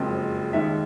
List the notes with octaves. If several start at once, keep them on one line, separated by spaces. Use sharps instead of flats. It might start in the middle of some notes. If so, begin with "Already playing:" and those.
Already playing: F#1 F2 C#3 F3 G#3
D#2 D#3 G#3 E5